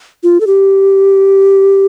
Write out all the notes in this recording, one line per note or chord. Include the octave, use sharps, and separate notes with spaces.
F4
A4
G4